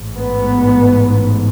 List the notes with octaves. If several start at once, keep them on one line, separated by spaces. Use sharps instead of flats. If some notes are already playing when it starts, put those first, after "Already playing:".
Already playing: A1 G#2
B3